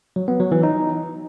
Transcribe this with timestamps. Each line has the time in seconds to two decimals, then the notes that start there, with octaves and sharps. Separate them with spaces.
0.16 F#3
0.28 B3
0.40 F#3
0.52 E3
0.63 D#4